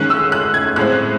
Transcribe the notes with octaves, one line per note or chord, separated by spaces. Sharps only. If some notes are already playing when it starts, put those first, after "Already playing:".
Already playing: D#3 G#3 C#4 F#6
E6
F#6
G#6
A2 G#3 C4 F#6